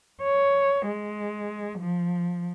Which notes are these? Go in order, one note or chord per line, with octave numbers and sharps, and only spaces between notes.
C#5
G#3
F3